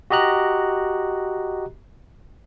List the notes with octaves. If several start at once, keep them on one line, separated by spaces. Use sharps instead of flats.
F#4 G4 D#5 A#5 F#6